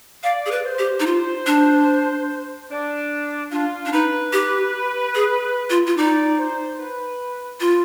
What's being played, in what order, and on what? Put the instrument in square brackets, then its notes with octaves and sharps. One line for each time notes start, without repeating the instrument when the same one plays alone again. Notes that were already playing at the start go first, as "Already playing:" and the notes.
[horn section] D5 [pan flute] F5
[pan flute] G#4
B4
[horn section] C5
[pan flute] G4
D#4
F4
D4
[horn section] D4
[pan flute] D4 [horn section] F4
[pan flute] D4
[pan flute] D#4 [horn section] B4
[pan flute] G4
G#4
F4
F4
[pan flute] D#4 [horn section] D5
[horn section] C5
B4
[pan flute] F4